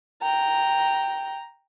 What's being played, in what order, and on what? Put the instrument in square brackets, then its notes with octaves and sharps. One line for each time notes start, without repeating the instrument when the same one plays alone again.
[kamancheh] G5 A#5